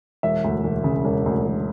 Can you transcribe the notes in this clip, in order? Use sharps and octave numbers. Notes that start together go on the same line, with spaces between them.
E1 E5
D2
E1
C#3
E1
D2
E1